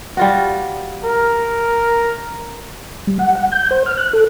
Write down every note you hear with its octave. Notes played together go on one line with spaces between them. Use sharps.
G3 F4 F#4
A#4
G3
F#5
F#5
G6
C5
F6
F#6
A4